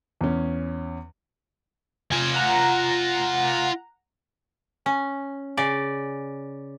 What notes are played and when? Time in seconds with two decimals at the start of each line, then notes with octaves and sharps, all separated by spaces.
0.21 E2 C#4
2.11 F4 G#5
2.34 F#5 A#5
4.86 C#4
5.57 C#3 D5